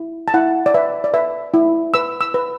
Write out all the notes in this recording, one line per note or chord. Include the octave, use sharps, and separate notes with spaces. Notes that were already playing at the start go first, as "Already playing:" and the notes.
Already playing: E4
A5
E4 F#5
D5
B4 E5
D5
B4 E5
E4
B4 E6
E6
B4